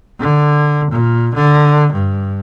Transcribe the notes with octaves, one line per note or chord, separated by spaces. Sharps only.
D3
A#2
D3
G2